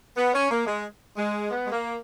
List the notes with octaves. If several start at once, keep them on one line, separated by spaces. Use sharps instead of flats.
B3
C#4
A#3
G#3
G#3
B3
G#3
A#3